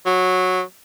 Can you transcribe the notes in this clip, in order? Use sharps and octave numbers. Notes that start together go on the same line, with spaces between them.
F#3